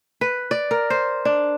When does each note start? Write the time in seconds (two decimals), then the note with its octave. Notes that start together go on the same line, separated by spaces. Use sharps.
0.21 B4
0.51 D5
0.71 A#4
0.90 C5
1.25 D4